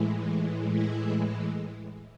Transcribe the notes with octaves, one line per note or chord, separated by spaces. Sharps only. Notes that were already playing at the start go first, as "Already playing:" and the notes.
Already playing: A2 E3 G#3
E4